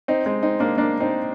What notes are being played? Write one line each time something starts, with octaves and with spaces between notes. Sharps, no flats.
C4 D#4
G#3 C4
C4 D#4
A#3 D4
A#3 D4
C4 D#4